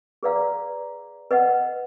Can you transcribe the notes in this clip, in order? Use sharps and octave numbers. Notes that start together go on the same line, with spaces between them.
G#4 B4 D5 F5 A#5
B4 D#5 F#5